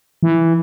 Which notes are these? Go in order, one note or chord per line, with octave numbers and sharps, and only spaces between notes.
E3